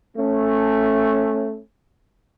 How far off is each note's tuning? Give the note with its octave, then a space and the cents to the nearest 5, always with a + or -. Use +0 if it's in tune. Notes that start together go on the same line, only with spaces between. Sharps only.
A3 +0 C#4 -20